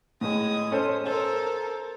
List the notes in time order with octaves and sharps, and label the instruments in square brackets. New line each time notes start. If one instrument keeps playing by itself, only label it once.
[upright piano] A2 [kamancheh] G#3 D#6
[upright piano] C#4 A4 C5
[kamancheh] A4 A#4 [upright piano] C5